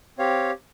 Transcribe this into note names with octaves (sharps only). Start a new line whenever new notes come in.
C4 G4 C#5 F5